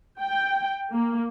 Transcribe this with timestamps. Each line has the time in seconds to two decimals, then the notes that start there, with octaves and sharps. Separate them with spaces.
0.21 G5
0.93 A#3